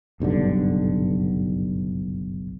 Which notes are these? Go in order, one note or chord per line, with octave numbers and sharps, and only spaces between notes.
F#1 B1 G2 D3